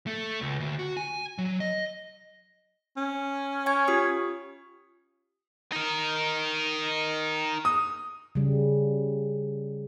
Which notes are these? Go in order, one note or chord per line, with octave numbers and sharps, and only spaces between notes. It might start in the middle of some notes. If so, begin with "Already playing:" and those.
A3
C#2
D2
F#4
G#5
F#3
D#5
C#4
C#5 G#5 G#6
F4 G4 D#6
D#4 A#4
D#6
C#3 G3